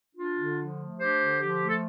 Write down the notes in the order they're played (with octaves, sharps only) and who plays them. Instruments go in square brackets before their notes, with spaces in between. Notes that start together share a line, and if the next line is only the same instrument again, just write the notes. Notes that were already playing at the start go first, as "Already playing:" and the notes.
[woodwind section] D4 F4
D3
F3
A3
D4 G4 C5
D3
F3 G4
A3
A4